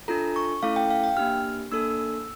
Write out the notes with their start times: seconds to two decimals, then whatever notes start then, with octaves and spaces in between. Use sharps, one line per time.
0.08 D4 F4 A4 A#5
0.36 C#6
0.63 A3 C#4 E4 A4 F5
0.76 G5
0.90 F5
1.04 G5
1.17 A#3 D4 G4 F6
1.72 A#3 D4 A4 E6